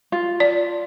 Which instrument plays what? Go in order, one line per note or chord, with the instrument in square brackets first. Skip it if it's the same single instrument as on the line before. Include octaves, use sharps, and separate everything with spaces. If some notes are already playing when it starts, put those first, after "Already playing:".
[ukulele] F4
[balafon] D5